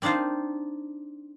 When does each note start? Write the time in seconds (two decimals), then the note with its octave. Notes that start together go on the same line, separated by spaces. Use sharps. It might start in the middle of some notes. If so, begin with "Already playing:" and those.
0.02 C4 D4 D#4 F4 C5